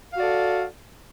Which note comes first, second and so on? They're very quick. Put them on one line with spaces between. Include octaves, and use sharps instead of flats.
F5 F#4 D5 A4